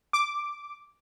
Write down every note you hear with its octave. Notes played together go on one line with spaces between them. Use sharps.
D6